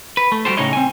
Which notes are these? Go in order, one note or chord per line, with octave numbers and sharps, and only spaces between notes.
B4
A3
G3 A3 F#4 G4 A4 C5
A2 C#3 G#3 D#4 C#5 D#5
C4 G#5